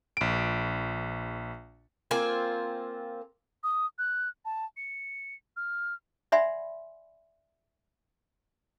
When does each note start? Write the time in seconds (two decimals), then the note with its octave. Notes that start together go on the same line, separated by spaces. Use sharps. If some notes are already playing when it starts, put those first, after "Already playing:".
0.17 A#1 D7
2.11 A#3 C4 F4 G#5
3.64 D#6
3.99 F#6
4.45 A5
4.77 C#7
5.57 F6
6.32 D5 E5 F#5 G#5 B5 C6